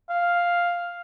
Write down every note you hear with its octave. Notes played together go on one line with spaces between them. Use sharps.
F5